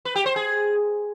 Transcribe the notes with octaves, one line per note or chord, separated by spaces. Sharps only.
B4
G4
C5
G#4